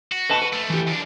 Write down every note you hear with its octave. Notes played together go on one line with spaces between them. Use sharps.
F#4
B4 D#5 A5
B4
F3 A3
E3 G4
D#2 D4